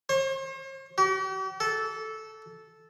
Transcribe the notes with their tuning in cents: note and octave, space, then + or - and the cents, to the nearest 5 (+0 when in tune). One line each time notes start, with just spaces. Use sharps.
C5 +45
G4 -45
A4 -10